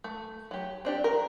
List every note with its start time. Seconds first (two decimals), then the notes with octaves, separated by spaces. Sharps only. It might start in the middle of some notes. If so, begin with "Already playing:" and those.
0.04 A3
0.51 F#3 G4
0.85 C4 D4 G4
1.04 A#4